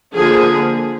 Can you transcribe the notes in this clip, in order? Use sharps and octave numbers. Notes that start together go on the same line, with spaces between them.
D3 F3 A#3 G#4